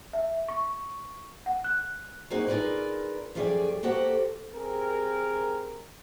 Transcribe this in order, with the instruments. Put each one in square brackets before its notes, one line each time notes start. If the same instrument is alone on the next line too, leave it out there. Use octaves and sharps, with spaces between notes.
[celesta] E5
C#6
F#5
F#6
[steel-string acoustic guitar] A#3 C4 D#4 F#4 G#4
D#4 F4 G#4 A#4 B4 D5
F#2 F3 A3 G4 G#4 D5
A#3 F#4 G4 A4 C5 F#5
[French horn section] C4 G4 G#4 A#4